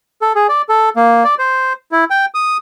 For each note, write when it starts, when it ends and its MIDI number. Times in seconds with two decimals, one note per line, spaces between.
0.22 0.33 69
0.35 0.47 68
0.49 0.62 74
0.69 0.89 69
0.96 1.24 58
1.24 1.35 74
1.39 1.73 72
1.92 2.04 64
2.10 2.26 79
2.34 2.57 87